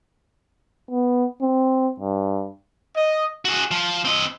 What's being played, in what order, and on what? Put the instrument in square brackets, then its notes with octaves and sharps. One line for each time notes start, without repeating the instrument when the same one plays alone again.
[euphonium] B3
C4
G2
[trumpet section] D#5
[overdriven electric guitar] F#4 G#4
F3
C4 D#5